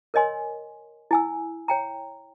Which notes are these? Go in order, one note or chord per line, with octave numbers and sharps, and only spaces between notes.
A#4 C#5 D#5 G#5 C6
E4 G#5 E6
C#5 G5 A#5